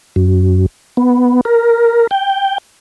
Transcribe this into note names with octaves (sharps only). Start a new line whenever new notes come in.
F#2
B3
A#4
G5